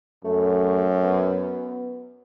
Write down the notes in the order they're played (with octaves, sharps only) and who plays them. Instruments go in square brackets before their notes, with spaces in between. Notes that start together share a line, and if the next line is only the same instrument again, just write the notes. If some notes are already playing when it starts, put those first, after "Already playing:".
[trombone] F#2 [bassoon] A3
[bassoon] B3